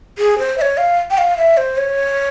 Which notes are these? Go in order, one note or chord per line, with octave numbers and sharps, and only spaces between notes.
G#4
C5
E5
C#5
F5
G5
F5
E5
C5
C#5